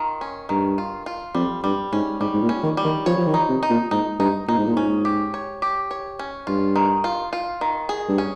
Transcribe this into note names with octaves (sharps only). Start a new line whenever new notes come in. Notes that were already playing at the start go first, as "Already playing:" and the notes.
Already playing: D#3 F4
C#4
G2 D#3
F4
F4
F2 G3
G2 G3
G#2 C#4
G#2 G3
G#2
A#2
C#4
D#3
G3
D#3
F3 C#5
F3
D#3
D#4
C3
D#4
A#2
G#2 D#4
G2 D#4
A#2 D#4
G#2
A#2
G#2 C#4
G4
C#5
G4
C#5
C#4
G2 F4
D#3
F4
F4
D#3
G#4
G2
C#4